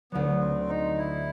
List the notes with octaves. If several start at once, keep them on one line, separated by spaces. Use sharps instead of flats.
D2 D3 F#3 B3
C4
D#4
E4